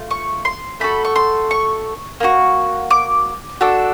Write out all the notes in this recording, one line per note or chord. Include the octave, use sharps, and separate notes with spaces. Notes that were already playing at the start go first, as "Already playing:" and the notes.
Already playing: A3 F4
C#6
C6
A3 D4 F#4 A4 B5
C#6
C6
C#6
A#3 D#4 F#4
D6
D4 F#4 A4